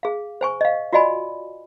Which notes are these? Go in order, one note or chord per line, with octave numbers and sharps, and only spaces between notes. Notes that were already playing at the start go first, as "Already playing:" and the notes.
G#4 F5
C5 G#5 C#6
D#5 F5
F4 F#4 D5 D#5 G#5 B5